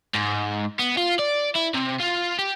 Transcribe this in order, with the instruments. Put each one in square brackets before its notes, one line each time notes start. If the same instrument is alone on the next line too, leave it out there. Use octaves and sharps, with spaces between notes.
[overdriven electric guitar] G#2
B3
F4
D5
E4
C3
F4
G4